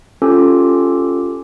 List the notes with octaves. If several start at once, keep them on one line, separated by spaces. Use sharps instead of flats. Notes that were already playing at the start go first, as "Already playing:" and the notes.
C#4 F4 G4 A4 D6